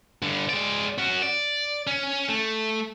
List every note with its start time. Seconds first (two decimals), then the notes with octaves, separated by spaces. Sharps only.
0.22 G2 D3
0.49 G#3 D5
0.98 C#4 F#4
1.22 D5
1.87 C#4
2.28 A3